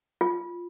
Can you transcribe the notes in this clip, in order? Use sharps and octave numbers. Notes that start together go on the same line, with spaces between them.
F4